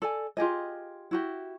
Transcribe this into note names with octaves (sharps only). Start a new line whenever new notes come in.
A4 D5 G#5
F4 G4 G#4 D#5
E4 F#4 G4